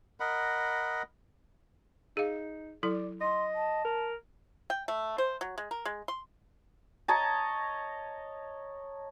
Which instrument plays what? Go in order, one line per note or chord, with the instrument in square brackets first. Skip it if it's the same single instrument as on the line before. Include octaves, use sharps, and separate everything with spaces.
[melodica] A#4 D#5 F#5 B5
[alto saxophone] D#4 [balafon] G#4 F5
[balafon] F#3 E4 A4 [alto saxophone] D5
[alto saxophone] D#5 [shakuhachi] C6
[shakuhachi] A5
[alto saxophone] A#4
[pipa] G5
A3
C5
F#3
G#3
A#4
G#3
C6
[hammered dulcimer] C#5 D#5 A5 A#5